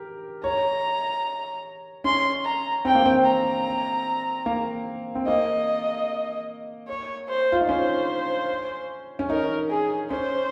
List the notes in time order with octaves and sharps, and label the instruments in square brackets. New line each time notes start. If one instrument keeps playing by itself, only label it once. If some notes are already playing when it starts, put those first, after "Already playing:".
Already playing: [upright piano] G4 A#4
[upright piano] C#5 [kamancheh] A#5
[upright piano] C#4 [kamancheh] C6
[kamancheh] A#5
[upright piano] C4 [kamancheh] G5
[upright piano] A#3
C4
[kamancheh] A#5
[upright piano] A#3
C4
[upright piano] A#3 [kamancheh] D#5
[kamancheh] C#5
C5
[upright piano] F4
D#4
[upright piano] C#4 [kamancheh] C5
[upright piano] C#4
[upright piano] D#4 [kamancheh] A#4
[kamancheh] G#4
[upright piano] C#4 [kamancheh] C5